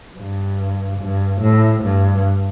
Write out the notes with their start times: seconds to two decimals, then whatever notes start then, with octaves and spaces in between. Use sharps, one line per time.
0.18 G2
1.01 G2
1.42 A2
1.83 G2